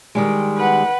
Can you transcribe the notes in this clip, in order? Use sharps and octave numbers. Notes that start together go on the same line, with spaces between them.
D#3 G3 G#3
B4 F#5